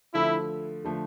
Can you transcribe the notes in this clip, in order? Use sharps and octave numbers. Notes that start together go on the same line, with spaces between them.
D3 F3 A3 E4
D3 F3 A3